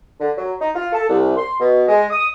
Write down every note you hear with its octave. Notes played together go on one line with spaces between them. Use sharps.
D3
F#3
D#4
F4
A4
C2
C6
B2
G#3
D#6